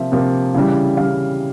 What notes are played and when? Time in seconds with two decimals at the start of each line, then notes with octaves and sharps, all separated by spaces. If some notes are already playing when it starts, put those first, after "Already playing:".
Already playing: C3 F3 A#3 E5
0.12 C3 F3 A#3
0.55 C#3 E3 G3
0.97 C#3 E3 G3 F5